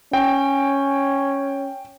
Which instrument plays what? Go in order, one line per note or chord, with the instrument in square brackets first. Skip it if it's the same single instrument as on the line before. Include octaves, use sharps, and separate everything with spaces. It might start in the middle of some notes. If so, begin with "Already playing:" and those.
[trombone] C#4 [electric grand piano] G5